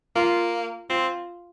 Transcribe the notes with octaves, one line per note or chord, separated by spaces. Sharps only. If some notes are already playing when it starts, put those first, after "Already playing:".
A#3 F4
C4 F4